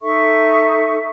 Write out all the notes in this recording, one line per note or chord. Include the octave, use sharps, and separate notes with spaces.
D#4 A4 E5 C#6